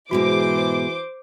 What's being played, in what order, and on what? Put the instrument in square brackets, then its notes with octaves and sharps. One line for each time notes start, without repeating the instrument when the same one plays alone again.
[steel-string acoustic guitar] G#2 B2 G#3 [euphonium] E3 [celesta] F#4 [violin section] C5 D6